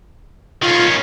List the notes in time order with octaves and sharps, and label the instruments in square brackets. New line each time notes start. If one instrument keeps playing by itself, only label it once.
[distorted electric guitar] D#3 C#4 [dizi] F4